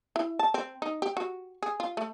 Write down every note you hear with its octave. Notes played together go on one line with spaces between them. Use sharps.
E4
A5
C4
D#4
G4
F#4
G#4
F4
A3